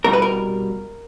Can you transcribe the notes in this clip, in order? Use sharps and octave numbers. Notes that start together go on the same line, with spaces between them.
C2 B2 G3 A#4
B4
A#4